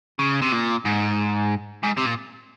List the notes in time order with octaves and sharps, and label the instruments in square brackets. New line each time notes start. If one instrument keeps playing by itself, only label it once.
[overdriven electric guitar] C#3
C3
A#2
G#2
G#2
C3
A#2